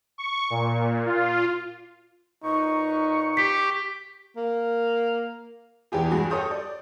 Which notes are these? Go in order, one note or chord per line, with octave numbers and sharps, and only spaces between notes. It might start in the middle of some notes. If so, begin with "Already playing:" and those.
C#6
A#2
F4
A#2 D#4 B4 C#6
G4 B6
A#3
E2 E3 G4 G#4
G2 F#4 G#4
G4 A4 C#5 D#6 G6
D5